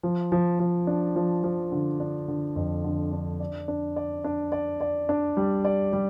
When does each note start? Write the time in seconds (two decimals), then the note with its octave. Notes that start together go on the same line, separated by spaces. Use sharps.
0.03 F3
0.32 F3
0.59 F3
0.87 D4
1.16 F3
1.44 F3
1.72 D3
2.00 D4
2.28 D3
2.56 F2
2.84 D3
3.12 D4
3.40 D5
3.68 D4
3.96 D5
4.24 D4
4.52 D5
4.81 D5
5.09 D4
5.37 G3
5.65 D5
5.93 G3